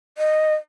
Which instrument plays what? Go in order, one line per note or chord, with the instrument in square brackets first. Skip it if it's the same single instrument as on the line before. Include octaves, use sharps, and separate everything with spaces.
[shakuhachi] D#5